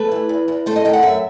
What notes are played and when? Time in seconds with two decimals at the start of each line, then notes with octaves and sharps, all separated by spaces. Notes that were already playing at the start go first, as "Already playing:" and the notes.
Already playing: A3 B4
0.12 E3
0.29 E2
0.48 E2
0.66 A3 C5
0.76 D#5
0.85 D#3 G5
0.93 F#5
1.03 F#2 E5